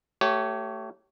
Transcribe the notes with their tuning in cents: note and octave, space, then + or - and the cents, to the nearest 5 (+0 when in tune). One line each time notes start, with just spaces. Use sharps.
A3 +15 G4 -30 C#5 +0